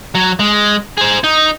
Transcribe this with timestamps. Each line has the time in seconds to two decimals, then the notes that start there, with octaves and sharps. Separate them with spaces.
0.15 F#3
0.39 G#3
0.98 G#4 C5
1.24 D#4